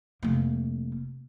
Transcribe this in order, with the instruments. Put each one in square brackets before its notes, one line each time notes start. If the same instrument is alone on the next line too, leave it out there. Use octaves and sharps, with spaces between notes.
[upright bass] F1 A#3